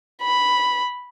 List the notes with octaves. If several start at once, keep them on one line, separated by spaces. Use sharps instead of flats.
B5